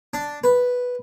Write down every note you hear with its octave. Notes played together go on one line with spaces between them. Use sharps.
D4
B4